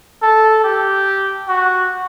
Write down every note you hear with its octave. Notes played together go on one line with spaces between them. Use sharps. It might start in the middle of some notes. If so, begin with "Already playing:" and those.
A4
G4
F#4